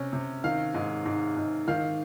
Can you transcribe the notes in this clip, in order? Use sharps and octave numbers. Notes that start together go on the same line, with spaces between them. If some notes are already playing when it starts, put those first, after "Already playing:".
Already playing: C3 C#4
C3
D#3 F5
G#2
G#2
G#2
D#3 F5